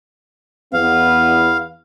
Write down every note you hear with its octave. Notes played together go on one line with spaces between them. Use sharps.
E2 B3 F5